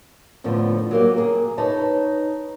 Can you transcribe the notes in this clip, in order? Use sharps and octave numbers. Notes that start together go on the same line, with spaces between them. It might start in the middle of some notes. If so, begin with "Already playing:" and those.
F2 A2 D3 F3 B3
F#3 A#3 G4
G#4 A#4
D#4 B4 C#5 A5